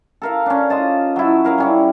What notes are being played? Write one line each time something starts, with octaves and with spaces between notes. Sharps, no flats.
A4 A#4 F5
C#4 D4
F4 D#5 A5
F#3 E4
C#4 A#4 F5
G3 C#4 E4